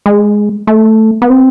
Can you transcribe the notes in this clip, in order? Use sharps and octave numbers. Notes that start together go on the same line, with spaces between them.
G#3
A3
B3
C4